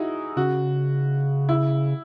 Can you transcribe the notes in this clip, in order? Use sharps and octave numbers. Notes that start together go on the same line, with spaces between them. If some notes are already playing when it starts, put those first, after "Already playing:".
Already playing: D#4 E4 F#4 G#4
C#3 F#4
E4